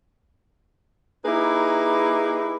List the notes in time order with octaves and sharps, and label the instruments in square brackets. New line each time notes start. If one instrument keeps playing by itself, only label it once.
[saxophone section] A#3 D#4 E4 G4 G#4 B4